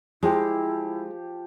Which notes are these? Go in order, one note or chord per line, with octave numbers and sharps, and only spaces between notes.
F3 G#3 E4 G4